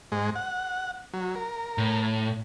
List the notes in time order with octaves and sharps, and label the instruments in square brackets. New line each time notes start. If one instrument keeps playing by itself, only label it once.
[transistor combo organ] G#2 G#3
F#5
F#3
A#4
[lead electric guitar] A2